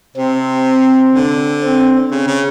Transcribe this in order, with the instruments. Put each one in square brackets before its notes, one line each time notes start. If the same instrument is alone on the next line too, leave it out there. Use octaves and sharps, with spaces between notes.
[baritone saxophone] C3 [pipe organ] C4
[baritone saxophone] D3
[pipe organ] C4
[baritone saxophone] C#3
C#3